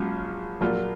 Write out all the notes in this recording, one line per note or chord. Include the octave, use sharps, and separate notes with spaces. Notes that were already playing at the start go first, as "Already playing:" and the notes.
Already playing: A#1 G#2 F#3 C#4 F4
A#1 A#2 F#3 A#3 F4